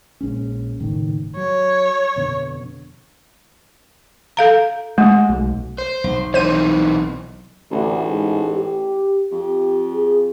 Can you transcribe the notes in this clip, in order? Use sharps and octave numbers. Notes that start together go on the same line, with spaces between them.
A#1 G#3 C#4
F#1 A2 D#3
F#3 C#5
F2 B2 D3
A4 F5 A#5
G#3 A3
B1
C5
B1
E3 C4 D#4 C5 D#7
A1 D2
G#2
G4
F2 G4
G#4